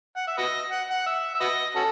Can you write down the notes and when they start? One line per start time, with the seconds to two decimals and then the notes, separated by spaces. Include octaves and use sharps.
0.16 F#5
0.28 E5
0.38 F#4 B4 D#5
0.72 F#5
0.91 F#5
1.07 E5
1.35 E5
1.41 F#4 B4 D#5
1.75 C#4 F#4 A4